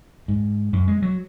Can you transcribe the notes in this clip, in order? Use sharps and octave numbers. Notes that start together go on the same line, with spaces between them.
G#2
F#2
G#3
F#3